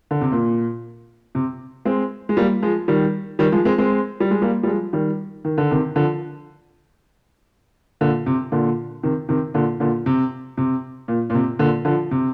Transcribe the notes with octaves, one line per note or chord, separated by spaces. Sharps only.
D3
C3
A#2
C3
G#3 C4
G#3
G3 A#3
F3 G#3
D#3 G3
D#3 G3
F3 G#3
G#3 C4
G#3 C4
G3
G#3
G3 A#3
G3
F3 G#3
D#3 G3
D#3
D3
C3 D#3
D3 F3
A#2 D3
C3
A#2 D3
C3 D#3
C3 D#3
A#2 D3
A#2 D3
C3
C3
A#2
A#2
C3
A#2 D3
D3 F3
C3